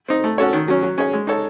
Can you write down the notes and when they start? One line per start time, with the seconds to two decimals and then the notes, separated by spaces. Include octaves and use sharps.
0.08 C4 D#4
0.24 A3
0.38 C#4 F#4 A4 C#5
0.53 D#3
0.68 F#3 C#4
0.83 F#3
0.98 C#4 G#4 C#5
1.13 G#3
1.27 D#4 A4 C#5